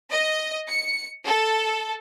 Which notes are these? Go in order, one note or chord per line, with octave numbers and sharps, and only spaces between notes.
D#5
C#7
A4